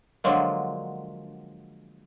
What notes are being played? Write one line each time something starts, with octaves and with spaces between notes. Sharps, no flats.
D3 F3 F#3 G#3 A#3